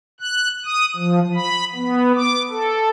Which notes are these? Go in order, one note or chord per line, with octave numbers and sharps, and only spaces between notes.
F#6
D#6
F3
B5
B3
D6
A4